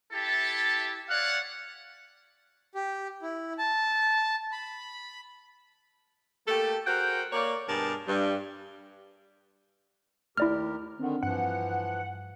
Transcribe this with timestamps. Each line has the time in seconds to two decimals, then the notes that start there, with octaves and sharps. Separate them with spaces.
0.12 E4 G4 A4 E5 A5
1.09 C#5 D5 F5 F#5
2.75 G4
3.22 E4
3.58 A5
4.52 B5
6.48 A3 A#3 G4 A4
6.87 F#4 G#4 A#4 C5 F#5 G5
7.33 A#3 C#5 D5
7.69 G2 B2 G#4 A#4 D5 A5
8.08 G2
10.37 D#2 A3 E4 G4 A#4 D5 F6
10.99 D3 D#3 C4 D4 F#5
11.23 G2 E3 F3 F#5